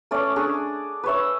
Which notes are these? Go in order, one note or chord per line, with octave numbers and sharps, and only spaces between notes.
A3 C#4 D5
D4 G#4
B4 C#5 E5